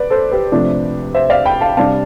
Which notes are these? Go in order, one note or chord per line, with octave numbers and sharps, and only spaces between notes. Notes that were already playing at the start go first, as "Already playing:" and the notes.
Already playing: B4 D5
A4 C5
G4 B4
C3 F3 A3 D4
C5 E5
D5 F5
G5 B5
F5 A5
C3 G3 D4 F5 A5